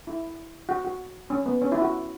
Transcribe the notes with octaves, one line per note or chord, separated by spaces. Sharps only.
E4
F#4
F#4
C#4
B3
C#4
E4
F#4